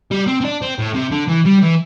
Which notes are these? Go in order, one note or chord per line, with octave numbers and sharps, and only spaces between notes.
G3
C4
C4
D4
C4
A2
C3
D3
E3
G3
E3